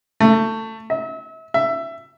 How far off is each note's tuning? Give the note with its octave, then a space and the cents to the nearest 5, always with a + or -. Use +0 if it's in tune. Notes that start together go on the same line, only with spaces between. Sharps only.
A3 +20
E5 -35
E5 +15